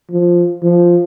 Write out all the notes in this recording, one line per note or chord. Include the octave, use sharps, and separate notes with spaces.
F3
F3